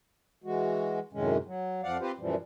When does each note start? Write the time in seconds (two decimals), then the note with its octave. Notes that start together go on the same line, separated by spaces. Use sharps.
0.44 E3 G#3 F#4
1.13 F#2 A2 C3 D#3 G#3 C#4
1.46 F#3
1.83 F2 F3 D5 F5 F#5
2.00 C4 F4 G4 B4 C5
2.18 F#2 A#2 E3 F3 G3